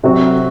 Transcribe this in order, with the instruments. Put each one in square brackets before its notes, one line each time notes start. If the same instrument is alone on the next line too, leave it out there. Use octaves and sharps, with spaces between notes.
[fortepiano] C3 F#3 C4 F#4